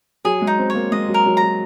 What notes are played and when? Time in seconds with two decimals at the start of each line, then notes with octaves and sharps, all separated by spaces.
0.25 F#3 G#4
0.42 G#3
0.47 D#4
0.58 C4
0.70 A#3 C#5
0.92 G#3 D#5
1.08 F#3
1.14 A#4
1.26 F#3
1.37 A#5
1.43 F#3